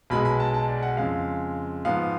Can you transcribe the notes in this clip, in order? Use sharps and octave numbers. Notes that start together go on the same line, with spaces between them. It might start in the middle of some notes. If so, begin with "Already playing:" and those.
B1 B2 G#3 B5
B5
A5
A5
D5
F#5
F2 C#3 G#3 F5
G#2 F3 B3 F5